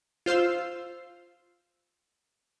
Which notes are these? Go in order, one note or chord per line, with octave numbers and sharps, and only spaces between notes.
F4 C5 F5 C6 E6